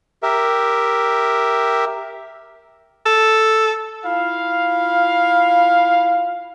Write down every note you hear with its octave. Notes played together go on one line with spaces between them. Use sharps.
G4 A#4 E5
A4
E4 F4 F5